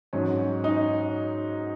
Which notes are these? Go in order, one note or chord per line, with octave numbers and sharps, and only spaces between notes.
G#2 F#3 C#4
D#4